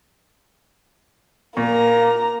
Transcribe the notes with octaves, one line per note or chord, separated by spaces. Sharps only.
A#2 A#3 A#5